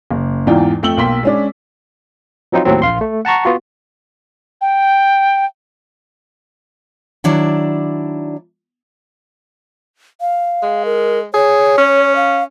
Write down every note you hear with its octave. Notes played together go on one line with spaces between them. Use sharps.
F#1
E2 G#2 E3 F4 D5 G5
F2 A3 G5 E6 F#7 G7
B1 A#3 G5 C6 B6
G#3 C#4 D4
F3 F#3 C4 D#4 F4
D#2 A2 F#3 C4
A#1 F5 C6
A3
F#5 A5 A#5 C#6
B3 F4 F#4
G5
D#3 F#3 D4 E4 D5
F5
G#3
A#4
G#4 C#5
C#4
F5